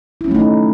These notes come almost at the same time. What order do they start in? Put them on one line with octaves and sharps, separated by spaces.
E4 C#4 F#3 A3 D#4